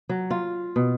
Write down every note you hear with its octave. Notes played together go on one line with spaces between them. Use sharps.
F#3
F4
B2